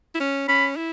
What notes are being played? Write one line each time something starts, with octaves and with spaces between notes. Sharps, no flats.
E4
C#4
C#4 B5
E4